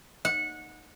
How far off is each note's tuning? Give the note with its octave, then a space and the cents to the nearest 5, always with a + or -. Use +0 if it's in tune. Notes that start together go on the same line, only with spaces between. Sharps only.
F#5 -20